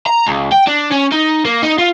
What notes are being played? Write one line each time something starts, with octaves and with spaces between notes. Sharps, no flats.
A#5
C#2
G5
D4
C#4
D#4
A#3
D#4
F4